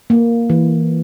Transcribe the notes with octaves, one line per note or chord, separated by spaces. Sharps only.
A#3
E3